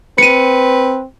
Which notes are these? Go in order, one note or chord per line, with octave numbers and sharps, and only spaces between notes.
C4 B4 C#7 D#7